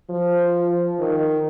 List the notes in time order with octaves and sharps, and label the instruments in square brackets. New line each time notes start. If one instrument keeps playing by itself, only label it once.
[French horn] F3
D#3